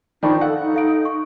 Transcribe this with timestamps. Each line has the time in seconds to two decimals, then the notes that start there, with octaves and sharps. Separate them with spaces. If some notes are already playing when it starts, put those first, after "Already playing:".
0.23 D#3 F3 D4 D#4 G5 B5 C#6
0.41 A4 F5 F#5
0.62 D#4
0.74 A4 F5 D7
1.05 C#6